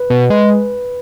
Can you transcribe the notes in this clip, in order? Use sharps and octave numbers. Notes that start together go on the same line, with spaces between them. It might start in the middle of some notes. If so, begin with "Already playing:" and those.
Already playing: B4
B2
G#3 B4